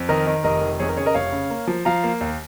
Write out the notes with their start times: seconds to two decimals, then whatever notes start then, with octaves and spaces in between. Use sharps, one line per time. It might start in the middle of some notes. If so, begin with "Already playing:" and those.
Already playing: F2
0.09 D#3 A#4 D#5
0.27 D#3
0.44 F1 A#4 D#5
0.61 D#3
0.80 F2 G#4 C#5
0.89 A#4
0.97 C#3 G#4 C#5
1.06 A#4 D#5
1.14 F1 C#5 F5
1.32 C#3
1.50 A#3
1.67 F3
1.85 F3 F5 A#5
2.04 A#3
2.21 D#2